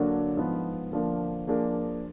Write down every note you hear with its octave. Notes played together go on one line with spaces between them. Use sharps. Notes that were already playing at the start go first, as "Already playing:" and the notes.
Already playing: D3 F#3 A#3 D4
G#2 F3 B3
D3 F3 A#3 D4
F3 A#3 D4 G#4